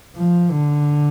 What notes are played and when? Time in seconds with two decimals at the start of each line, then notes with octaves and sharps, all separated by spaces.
0.16 F3
0.51 D3